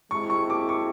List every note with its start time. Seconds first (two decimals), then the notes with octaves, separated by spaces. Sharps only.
0.11 G#3 C4 E4 C#6
0.30 C#6
0.50 D6
0.69 C#6